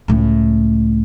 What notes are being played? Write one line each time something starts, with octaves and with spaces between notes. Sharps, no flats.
C#2 A2